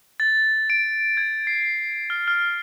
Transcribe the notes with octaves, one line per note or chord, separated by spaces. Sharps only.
A6
D7
G#6
C7
F6
F6